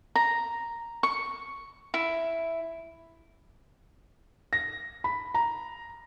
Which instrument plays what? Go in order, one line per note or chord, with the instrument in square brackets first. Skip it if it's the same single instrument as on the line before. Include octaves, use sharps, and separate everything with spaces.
[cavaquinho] A#5
C#6
E4
[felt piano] A#6
B5
A#5